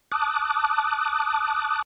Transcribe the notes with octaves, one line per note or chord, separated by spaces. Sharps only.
A5 D6 D#6 F#6